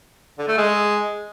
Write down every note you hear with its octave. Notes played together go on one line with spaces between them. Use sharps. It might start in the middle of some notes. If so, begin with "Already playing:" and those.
D3
A3
G#3